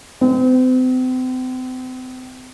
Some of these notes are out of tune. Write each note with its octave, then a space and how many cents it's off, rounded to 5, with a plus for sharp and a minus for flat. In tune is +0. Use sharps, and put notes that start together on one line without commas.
C4 -40